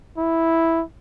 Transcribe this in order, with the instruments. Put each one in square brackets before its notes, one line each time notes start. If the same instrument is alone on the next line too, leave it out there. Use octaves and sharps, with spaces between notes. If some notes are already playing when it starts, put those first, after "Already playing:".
[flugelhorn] E4